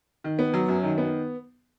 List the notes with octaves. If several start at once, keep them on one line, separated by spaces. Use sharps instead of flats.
D#3
B3
F#3
F#2
D#3
B3